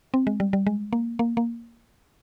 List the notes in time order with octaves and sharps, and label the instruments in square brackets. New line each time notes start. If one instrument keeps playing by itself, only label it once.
[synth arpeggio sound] C4
G#3
G3
G3
G#3
A#3
A#3
A#3